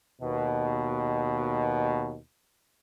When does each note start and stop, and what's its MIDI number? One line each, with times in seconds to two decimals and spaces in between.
0.22 2.18 39
0.22 2.18 47